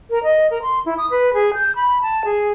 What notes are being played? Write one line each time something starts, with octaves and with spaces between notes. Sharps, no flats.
A#4
D#5
A#4
C6
E4
D#6
B4
G#4
G6
B5
A5
G#4